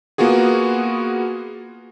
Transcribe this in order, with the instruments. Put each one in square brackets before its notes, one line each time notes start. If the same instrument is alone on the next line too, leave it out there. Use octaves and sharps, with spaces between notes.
[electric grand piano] A#3 B3 F4 F#4 G#4